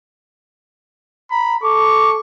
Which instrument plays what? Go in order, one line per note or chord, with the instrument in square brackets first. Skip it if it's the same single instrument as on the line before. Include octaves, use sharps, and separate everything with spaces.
[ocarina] A#5 [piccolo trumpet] B5
[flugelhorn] A4 [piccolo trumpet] C#6 [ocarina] D6